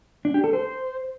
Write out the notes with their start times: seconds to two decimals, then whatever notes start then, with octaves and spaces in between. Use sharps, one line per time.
0.25 D4
0.34 G4
0.44 A4
0.53 C5